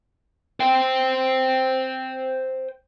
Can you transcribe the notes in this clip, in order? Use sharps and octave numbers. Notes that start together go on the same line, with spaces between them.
C5 G5